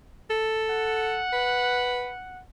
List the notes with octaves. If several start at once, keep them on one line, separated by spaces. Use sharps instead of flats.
A4
F#5
B4